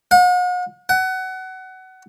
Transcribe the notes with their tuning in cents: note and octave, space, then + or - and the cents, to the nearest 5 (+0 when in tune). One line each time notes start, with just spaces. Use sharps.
F#5 -40
F#5 +25